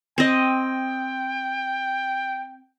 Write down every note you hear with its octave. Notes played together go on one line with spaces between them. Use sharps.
C4 D#5 G5